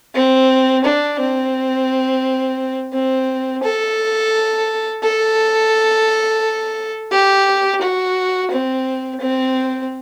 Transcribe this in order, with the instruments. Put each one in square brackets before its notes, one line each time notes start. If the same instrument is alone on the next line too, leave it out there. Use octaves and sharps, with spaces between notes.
[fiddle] C4
D4
C4
C4
A4
A4
G4
F#4
C4
C4